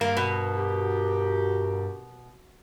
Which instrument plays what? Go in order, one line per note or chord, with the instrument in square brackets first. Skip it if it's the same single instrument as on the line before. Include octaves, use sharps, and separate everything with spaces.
[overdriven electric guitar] G2 [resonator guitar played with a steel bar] A#3
[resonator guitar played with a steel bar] B2 [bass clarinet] A#4
[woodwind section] F#4 G4